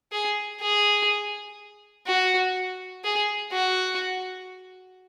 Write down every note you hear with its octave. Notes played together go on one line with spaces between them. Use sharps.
G#4
G#4
F#4
G#4
F#4